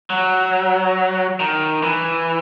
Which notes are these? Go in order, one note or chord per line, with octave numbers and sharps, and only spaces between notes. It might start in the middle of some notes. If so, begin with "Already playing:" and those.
F#3
D#3
E3